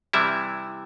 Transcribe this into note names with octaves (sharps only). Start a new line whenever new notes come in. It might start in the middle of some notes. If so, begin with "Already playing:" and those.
C3 E3 G3 E4 E5